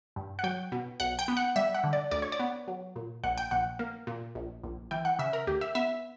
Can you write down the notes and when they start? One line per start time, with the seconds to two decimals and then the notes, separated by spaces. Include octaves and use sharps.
0.16 G2
0.39 F#5
0.44 F#3 G5
0.72 B2
1.00 B1 F#5
1.19 G5
1.28 B3
1.37 F#5
1.56 G3 E5
1.74 F#5
1.84 D3
1.93 D5
2.11 D2 D5
2.22 C#5
2.32 D5
2.39 B3
2.68 F#3
2.96 A#2
3.24 A#1 F#5
3.38 G5
3.51 A#1 F#5
3.79 A#3
4.07 A#2
4.35 A#1
4.64 A#1
4.91 E3 G5
5.05 F#5
5.19 C#3 E5
5.33 A#4
5.47 D2 G4
5.61 E5
5.75 B3 E5